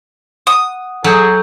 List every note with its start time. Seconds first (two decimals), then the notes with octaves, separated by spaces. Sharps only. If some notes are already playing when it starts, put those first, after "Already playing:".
0.47 F#5 D#6
1.04 F#3 G#4 A4 G6